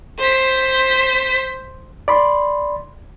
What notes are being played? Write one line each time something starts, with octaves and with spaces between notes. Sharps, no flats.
C5 B6
D5 B5 C6